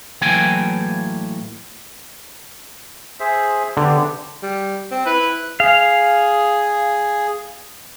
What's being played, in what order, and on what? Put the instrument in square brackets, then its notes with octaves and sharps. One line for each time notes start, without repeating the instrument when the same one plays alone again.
[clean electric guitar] A2 E3 F#3 A#3 G5 G#5
[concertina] G#4 C5 E5
[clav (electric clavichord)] D3 [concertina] B3 G4
[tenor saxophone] G3
C4
[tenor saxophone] E4 [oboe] B4
[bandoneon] G#4 [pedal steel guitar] F5